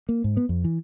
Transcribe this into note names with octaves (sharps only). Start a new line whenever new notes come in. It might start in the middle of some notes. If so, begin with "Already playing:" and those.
A#3
G#2
B3
F2
E3